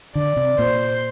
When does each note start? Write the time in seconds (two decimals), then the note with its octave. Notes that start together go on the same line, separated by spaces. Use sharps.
0.15 D3 D5
0.37 C3
0.59 A#2 C5